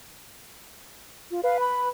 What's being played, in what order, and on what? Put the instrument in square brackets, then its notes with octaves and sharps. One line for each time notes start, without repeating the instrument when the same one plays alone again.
[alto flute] F4
[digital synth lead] B4 [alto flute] F5
[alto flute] B5